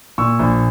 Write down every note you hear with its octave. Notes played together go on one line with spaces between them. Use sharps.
A#2 C#6 E6
A#1